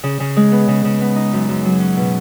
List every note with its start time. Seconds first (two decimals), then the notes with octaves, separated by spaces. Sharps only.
0.03 C#3
0.20 C#3
0.36 G#3
0.52 B3
0.68 C#3
0.85 C#3
1.01 B3
1.16 D#4
1.33 F#2
1.49 F#2
1.65 F#3
1.80 C#4
1.97 B2